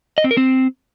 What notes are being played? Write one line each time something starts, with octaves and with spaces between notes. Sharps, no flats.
D#5
C4
A#4
C4